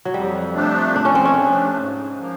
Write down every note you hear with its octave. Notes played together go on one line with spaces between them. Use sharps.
F#3
F2 G3
C3 F3 A3 D4
F2 D4
C#4
C4
C#4
C3 F3 A3 D4
G#2
F3 A#3